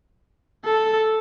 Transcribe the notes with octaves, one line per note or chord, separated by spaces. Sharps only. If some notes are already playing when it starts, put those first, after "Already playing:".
A4